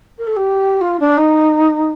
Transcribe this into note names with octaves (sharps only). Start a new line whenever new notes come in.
A#4
A4
G4
F4
D4
D#4